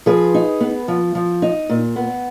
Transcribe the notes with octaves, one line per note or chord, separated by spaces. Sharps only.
F3 G#4 B4
D#4
B3
F3
F3
D#4
A#2
B3